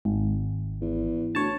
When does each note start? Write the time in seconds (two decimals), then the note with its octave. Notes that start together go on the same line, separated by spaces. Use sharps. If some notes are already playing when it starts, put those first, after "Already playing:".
0.05 G#1
0.81 E2
1.35 D2 C#5 A5